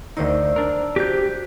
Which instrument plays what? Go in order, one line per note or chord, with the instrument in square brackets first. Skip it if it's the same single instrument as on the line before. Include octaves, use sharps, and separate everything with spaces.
[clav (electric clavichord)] D2 D#3 D#4 [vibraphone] C5 D5 E6
[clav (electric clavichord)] D4 A#4
[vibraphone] F#4 C5 [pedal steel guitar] G4 G6